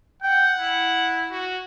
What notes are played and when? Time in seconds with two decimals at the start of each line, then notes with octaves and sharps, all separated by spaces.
0.23 F#5 G5
0.58 E4
1.32 F#4